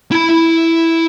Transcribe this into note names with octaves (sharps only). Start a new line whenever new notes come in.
E4 B5